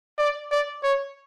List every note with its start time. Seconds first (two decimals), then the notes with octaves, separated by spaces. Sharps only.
0.19 D5
0.51 D5
0.83 C#5